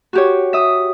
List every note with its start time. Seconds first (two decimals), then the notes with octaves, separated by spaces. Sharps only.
0.13 F#4 G4 C#5
0.53 E5 D#6